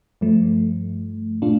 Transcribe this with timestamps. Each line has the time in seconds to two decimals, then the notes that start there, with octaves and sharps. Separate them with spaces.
0.21 G2 F3 A3
1.42 A#2 A3 D4 F4